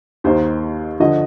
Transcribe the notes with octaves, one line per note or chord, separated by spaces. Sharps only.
D#2 D#3 C5
D3 F3 D#5